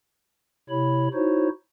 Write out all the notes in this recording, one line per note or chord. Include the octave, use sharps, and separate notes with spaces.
C3 E4 C#5 B5
D#4 E4 F#4 C5 C#5